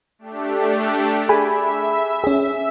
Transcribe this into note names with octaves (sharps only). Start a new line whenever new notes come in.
A3 D4 G4
G#4 E5 G#5 B5
C#4 G#4